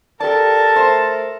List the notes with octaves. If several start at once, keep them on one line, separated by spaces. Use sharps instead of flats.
G4 A4 A#4 D5 A5
A3 C5